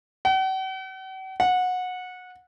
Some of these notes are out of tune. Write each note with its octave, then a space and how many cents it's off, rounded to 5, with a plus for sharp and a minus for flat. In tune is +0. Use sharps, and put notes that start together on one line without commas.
F#5 +45
F#5 -20